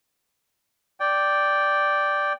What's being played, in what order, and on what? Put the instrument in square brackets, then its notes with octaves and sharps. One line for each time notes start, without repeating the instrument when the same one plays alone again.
[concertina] D5 G5